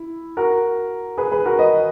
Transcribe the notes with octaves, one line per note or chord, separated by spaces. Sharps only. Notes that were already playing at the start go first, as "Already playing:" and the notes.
Already playing: E4
F#4 A#4
G#4 B4
G#4 B4
F#4 A#4
B4 D#5